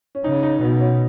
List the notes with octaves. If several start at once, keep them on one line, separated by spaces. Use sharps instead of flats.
C#4
C#3 D#4
D#4
B2 B3
C#4